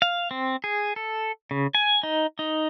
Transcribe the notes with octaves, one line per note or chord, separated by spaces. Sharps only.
F5
C4
G#4
A4
C#3
G#5
D#4
D#4